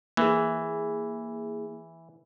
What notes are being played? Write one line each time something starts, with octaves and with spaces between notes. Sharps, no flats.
E3 A#3 E4 G#4